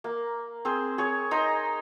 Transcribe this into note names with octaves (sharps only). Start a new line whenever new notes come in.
A#3
C4 G#4 C5
G#4 C#5
D#4 C5 A#5